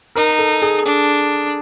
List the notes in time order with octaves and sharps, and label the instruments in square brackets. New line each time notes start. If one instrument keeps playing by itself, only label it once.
[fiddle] D#4 [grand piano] A#4
[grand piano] A4
G#4
[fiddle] D4